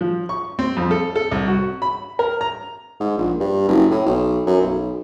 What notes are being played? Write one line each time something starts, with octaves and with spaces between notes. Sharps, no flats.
F3
C#6
C4
F2
A4
A4
C2
F#4
B5
A#4
A#5
G#2
A#1
G2
F#1
A2
B1
F#2
B1